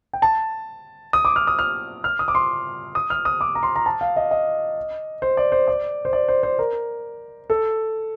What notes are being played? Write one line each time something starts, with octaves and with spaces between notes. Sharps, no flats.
G5
A5
D#6
D6
F6
D#6
F6
F6
D#6
D6
C6
D#6
F6
D#6
D6
A#5
C6
A#5
A5
F5
D#5
D#5
C5
D5
C5
D5
C5
D5
C5
C5
A#4
A4